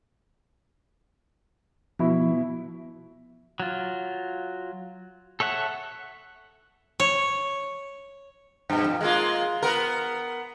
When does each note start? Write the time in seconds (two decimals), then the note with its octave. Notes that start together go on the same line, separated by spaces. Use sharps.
1.99 B2 F3 B3 E4
3.60 F#3 F4
5.40 A4 C#5 E5 F#5
7.00 C#5
8.70 G2 B2
8.84 F2
9.01 G#3 A#3 F4
9.62 B3 A#4